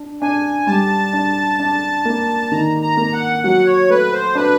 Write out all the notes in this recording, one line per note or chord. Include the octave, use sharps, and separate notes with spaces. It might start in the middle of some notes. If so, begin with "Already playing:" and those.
Already playing: D4
D4 G#5
G3 A5
D4
D4
A#3
D#3 A#5
A#5
A#3
F#5
F#3 F#5
C#5
A3 B4
C5
D4 B4